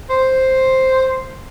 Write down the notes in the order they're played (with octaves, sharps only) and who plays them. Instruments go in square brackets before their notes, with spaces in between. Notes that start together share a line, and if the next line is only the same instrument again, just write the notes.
[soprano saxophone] C5